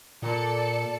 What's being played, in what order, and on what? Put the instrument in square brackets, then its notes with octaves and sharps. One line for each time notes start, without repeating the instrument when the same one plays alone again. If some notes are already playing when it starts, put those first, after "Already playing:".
[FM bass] A#2 [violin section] A4 D5 C#7